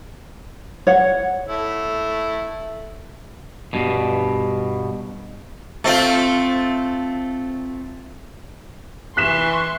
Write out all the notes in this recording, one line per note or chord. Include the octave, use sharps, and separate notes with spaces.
C#5 F#5
A3 E4
G2 B2
A3 C4 F4
E3 C6 C#6 F#6 B6 E7